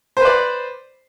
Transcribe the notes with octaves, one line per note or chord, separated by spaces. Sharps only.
B4 C5 D5